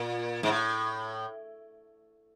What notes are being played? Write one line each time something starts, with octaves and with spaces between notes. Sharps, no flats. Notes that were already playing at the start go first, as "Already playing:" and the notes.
Already playing: A#2
G#2
A2